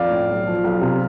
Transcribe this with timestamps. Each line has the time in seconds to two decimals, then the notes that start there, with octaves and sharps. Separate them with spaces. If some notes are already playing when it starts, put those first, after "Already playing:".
Already playing: F2 D5 F5
0.11 A2
0.29 B1
0.47 F3
0.64 B1
0.81 C3